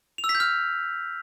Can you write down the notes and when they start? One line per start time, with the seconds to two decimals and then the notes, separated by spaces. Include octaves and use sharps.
0.18 F7
0.24 E6
0.29 B6
0.35 G6
0.40 F6